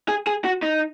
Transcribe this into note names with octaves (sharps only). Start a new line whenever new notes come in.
G#4
G#4
F#4
D#4